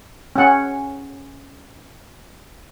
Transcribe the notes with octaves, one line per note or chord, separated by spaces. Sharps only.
C#4 F#5